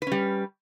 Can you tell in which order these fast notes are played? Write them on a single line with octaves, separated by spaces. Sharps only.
B4 C#4 G3